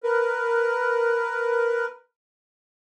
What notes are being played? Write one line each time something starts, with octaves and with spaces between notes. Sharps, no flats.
A#4 B4